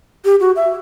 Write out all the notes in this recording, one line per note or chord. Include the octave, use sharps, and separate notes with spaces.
G4
F#4
E5